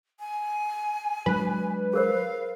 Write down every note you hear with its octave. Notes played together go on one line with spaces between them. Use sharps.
G#5
F#3 G#3 D4 B4
G#4 A#4 C5 F5